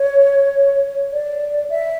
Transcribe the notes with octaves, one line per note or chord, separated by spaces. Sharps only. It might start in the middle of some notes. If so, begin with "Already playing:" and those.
Already playing: C#5
D5
E5